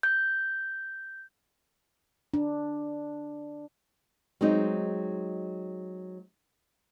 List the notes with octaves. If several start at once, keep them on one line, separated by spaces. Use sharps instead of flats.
G6
D4
F#3 G#3 C4 D#4